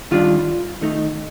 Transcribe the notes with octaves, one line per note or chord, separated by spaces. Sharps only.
D#3 G3 D4 F4
D#3 A3 D#4